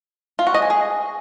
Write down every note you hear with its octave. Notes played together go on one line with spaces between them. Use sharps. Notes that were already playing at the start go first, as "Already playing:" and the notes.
F4
F#4
D#5
G#5
G#4